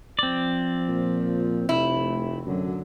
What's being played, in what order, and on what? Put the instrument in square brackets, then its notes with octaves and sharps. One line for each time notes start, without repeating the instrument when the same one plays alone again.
[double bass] F3 [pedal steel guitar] C4 D5
[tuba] A#2
[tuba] F1 [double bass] C3 A3 [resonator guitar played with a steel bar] E4
[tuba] F#2 [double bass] D3 F#3